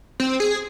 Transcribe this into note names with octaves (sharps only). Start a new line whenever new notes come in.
C4
G#4